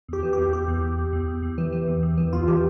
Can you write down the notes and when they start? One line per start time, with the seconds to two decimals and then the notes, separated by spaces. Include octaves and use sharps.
0.08 E2 G4
0.23 E3
0.33 G4
0.38 E2
0.53 E2 G4
0.68 E2
0.83 E2
0.98 E2
1.13 E2
1.28 E2
1.43 E2
1.58 E3
1.73 E3
1.88 E2
2.03 E2
2.18 E3
2.33 E2 F4
2.48 E3 G4